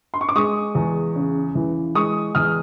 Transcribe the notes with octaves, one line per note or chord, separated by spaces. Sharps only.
C6
C#6
D6
G#3 C#6 D#6
E2
C#3
E3
G#3 C#6 D#6
E2 D#6 F6